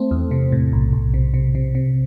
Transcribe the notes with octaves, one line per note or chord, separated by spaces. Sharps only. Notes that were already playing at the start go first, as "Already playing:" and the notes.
Already playing: A3 C4
E2
C3
A2
B1
B1
C3
C3
C3
C3